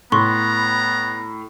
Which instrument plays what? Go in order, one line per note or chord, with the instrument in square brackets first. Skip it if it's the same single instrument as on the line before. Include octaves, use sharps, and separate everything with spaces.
[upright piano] A2 [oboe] B3 [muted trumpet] A#5 [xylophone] C6 C#6